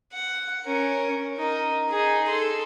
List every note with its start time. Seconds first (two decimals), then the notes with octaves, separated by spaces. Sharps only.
0.13 F#5
0.65 C#4 A#4
1.38 D#4 A#4
1.90 D#4 G#4
2.28 A4 C6